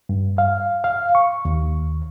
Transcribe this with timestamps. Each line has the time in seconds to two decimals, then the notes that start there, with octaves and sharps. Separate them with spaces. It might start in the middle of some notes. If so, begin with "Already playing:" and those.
0.09 G2
0.38 F5
0.84 F5
1.15 C#6
1.45 D#2